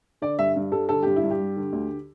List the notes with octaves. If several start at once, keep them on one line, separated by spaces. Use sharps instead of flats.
D3 D5
G2 E5
G2
G3 A4
D3 A4
G2 G4
E4
G2
G4
G3
D3
D2